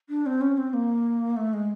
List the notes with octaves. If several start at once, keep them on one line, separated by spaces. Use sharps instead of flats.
D4
C4
C#4
C4
A#3
A3
G#3